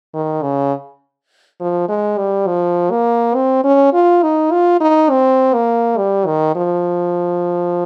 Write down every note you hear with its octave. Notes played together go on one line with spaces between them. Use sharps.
D#3
C#3
F3
G#3
G3
F3
A#3
C4
C#4
F4
D#4
F4
D#4
C4
A#3
G3
D#3
F3